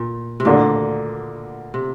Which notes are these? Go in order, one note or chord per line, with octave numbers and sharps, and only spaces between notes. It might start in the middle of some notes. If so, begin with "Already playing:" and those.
Already playing: A#2
C3
D2 A#2 D3 A#3
C3